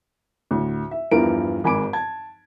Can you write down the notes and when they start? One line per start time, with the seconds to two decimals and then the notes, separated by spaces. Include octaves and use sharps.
0.51 D2 A2
0.91 E5
1.11 E2 G2 F3 E4 A#4 D7
1.64 G#1 G#2 G#5 B5 D6 D7
1.93 A5 G#6